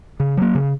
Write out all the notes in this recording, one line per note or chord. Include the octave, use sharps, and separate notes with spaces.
C#3
F#3 A#3
C#3